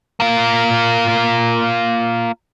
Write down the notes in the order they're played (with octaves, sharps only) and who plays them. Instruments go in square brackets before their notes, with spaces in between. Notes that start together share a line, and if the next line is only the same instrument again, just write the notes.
[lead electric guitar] A#3 F4